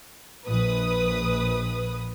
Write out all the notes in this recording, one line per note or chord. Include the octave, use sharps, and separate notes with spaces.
A#1 B4 D#6